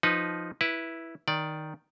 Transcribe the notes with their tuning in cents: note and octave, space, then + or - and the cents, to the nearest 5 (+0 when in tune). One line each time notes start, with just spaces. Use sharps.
F3 +0 D#4 +0 B4 +0
E4 +0 B4 -15
D#3 +0 D5 +0